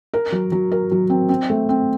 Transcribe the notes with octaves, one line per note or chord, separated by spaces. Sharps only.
A#4
F#3
F#3
A#4
F#3
C4
C4
A3
C4